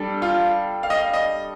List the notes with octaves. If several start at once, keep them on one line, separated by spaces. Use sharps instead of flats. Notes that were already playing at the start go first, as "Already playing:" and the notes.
Already playing: G3 D4 A4
F4
F5
D#5
F5
D#5